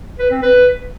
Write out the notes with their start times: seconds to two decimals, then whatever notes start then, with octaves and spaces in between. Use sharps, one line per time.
0.19 B4
0.31 C4
0.42 B4